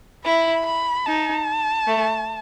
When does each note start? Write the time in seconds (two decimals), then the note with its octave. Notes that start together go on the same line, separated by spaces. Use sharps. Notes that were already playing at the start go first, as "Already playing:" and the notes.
0.25 E4 B5
0.66 B5
1.06 D#4 A5
1.87 A3